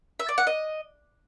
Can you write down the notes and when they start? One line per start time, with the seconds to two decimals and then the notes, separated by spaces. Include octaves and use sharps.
0.20 E5
0.29 D5
0.38 F#5
0.47 D#5